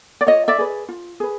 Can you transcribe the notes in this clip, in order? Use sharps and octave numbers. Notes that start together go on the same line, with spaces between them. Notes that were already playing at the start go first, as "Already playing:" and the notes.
D5
F4 C#5 D#5
D5 E5
G#4 B4
F4
G#4 B4